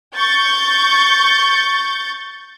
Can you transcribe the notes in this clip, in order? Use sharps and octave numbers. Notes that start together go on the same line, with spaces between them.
C#6 G6 A6